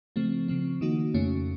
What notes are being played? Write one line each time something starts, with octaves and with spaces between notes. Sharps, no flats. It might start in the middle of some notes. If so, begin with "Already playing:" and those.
C#3 F3 A3 C4
C#3 F3 C4
D#3 A#3 D#4 F#4
F2 C#3 A3 C#4